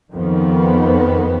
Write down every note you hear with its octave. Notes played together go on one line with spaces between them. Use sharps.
F2 D#3 B3